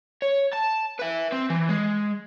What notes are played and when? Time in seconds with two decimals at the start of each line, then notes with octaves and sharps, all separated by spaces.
0.22 C#5
0.53 A5
0.99 B4 E5
1.32 C4
1.50 E3
1.69 G#3